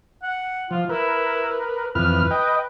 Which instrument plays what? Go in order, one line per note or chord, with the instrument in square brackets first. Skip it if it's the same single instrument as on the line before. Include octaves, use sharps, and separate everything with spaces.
[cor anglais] F#5
[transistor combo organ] F3 [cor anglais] F4
[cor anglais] E4 [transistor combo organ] A#4 B4
[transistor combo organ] F2 E3 F6 [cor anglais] B4
[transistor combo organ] D#5 G5